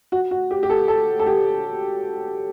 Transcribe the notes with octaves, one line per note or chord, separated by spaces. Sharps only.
F#4
F#4
G4
G4
A4
A4
A4
G4